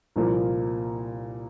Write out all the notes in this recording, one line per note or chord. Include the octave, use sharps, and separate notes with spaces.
C2 A#2 F3 A#3